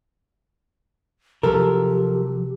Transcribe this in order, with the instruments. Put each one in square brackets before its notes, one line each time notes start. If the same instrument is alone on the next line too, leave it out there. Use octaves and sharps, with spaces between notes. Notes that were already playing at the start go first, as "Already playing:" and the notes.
[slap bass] C3 F#3 [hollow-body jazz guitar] F3 A4 A#4 [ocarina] G4